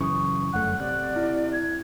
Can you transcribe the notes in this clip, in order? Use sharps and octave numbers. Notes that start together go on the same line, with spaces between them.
F#2 C#3 E3 C#6 D#6
G1 F#2 A3 F#5 F#6
C3 D5 F#6
E4
G#6